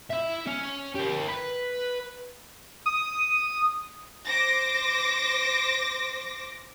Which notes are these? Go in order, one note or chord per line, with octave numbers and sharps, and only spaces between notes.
E4 E5
C#4
G4 A#4
B4
D#6
C5 D6 A#6